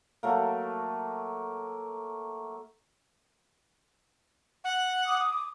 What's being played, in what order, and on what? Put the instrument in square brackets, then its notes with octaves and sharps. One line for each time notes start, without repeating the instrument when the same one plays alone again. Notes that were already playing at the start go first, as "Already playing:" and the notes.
[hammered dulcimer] F#3 A3 A#3
[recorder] F#5
[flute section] D6 D#6